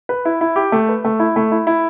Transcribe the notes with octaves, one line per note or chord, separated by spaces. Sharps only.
B4
E4
E4
G4
A3
B4
A3
E4
A3
E4
E4